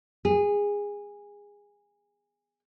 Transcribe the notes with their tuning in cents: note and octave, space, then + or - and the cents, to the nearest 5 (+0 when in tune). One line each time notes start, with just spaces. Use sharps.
G#4 -20